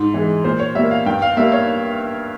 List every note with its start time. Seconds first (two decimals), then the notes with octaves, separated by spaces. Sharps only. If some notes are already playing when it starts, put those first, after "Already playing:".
Already playing: G#2
0.14 E3 G#3
0.45 A#2 C5
0.59 C#5
0.75 G3 A#3 E5
0.91 F5
1.06 G2 G5
1.22 F5
1.37 G3 A#3 E5
1.52 C#5